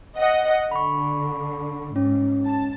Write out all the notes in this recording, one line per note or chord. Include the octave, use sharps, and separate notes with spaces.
D#5 F#5
D3 B5 C#6
G#2 C#4
A5